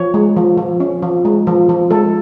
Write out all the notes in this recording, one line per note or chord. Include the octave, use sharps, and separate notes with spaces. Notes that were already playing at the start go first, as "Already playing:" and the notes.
Already playing: F3 C#5
G#3
F3
F3
C#4
F3
G#3
F3
F3
G#3 A4